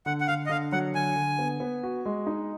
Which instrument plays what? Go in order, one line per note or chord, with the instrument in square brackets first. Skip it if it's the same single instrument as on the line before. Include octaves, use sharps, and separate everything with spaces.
[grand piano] D3 [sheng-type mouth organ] F#5
[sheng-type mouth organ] F#5
[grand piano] D3 [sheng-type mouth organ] F5
[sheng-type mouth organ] D#5
[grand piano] D3 [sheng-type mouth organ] F5
[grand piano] F#3 [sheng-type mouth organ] F#5
[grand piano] D3 [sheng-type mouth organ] G#5
[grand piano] D3
B3
B3
F#4
G#3
D#4